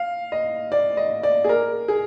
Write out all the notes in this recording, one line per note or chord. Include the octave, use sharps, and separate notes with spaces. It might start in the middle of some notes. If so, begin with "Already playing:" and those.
Already playing: F5
D#5
D5
D#5
D5
G#4
A#4
G#4